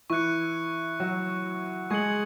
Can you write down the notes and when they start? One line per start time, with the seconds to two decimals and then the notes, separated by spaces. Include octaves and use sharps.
0.10 E3 E4 C#6 F#6 C#7
1.00 F#3 F#4
1.90 G#3 G#4 C#6 G#6 C#7 F#7